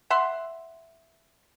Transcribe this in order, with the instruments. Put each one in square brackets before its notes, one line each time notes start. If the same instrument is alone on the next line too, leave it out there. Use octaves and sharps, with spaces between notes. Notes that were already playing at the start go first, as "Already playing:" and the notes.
[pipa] E5 F#5 C6